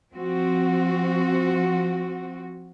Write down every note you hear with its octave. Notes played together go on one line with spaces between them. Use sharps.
F3 C4 F#4